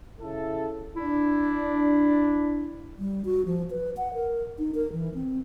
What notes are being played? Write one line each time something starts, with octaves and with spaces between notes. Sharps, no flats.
C#3 E4 A4
D4 E4
G3
F#4
F3
B4
F#5
A#4
D#4
A#4
E3
C4